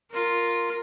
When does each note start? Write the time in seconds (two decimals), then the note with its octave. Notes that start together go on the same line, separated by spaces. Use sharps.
0.11 F4 A#4